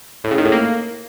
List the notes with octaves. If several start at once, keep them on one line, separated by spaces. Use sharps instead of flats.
A2
C#3
D#3
A2
A#3